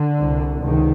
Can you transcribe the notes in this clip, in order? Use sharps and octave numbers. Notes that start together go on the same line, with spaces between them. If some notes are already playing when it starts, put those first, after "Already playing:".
Already playing: D3
C2 C3
C#2 C3 D#3